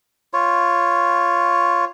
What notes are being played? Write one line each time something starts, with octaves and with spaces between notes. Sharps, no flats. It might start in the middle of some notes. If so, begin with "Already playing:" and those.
F4 C#5